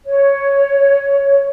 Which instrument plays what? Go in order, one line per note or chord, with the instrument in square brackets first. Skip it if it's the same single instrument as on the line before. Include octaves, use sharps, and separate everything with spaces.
[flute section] C#5